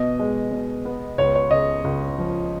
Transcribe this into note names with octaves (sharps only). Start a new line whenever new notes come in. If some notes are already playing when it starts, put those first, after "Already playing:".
Already playing: B2 D#5
G#3
B2
B3
C#2 C#5
C#5
C#3 D#5
C#2
F3